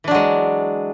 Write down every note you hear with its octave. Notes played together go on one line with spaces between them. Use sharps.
E3 F#3 G#3 D4